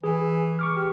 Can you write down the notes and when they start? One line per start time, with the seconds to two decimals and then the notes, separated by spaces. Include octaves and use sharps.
0.04 E3 G#4
0.59 C#6 D6 F6
0.76 G4